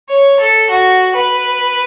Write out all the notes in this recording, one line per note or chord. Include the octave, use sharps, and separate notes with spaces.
C#5
A4
F#4
B4